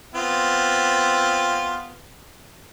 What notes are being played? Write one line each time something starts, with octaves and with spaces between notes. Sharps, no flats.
B3 C4 F4